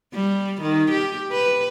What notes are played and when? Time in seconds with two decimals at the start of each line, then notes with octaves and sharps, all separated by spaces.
0.13 G3
0.62 D#3
0.91 G4
1.32 B4